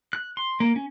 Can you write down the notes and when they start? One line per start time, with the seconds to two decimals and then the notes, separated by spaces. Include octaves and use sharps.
0.13 F#6
0.37 C6
0.60 A#3
0.76 C#4